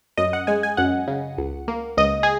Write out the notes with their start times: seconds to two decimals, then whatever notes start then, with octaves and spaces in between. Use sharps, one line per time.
0.17 F#2 D#5
0.33 F#5
0.47 G#3 G#5
0.63 G#5
0.77 F#2 F#5
1.08 C#3
1.38 C#2
1.68 A#3
1.97 C#2 D#5
2.23 G#4